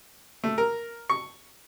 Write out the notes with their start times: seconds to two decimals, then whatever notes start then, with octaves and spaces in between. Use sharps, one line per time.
0.44 A3
0.58 A#4
1.10 C#6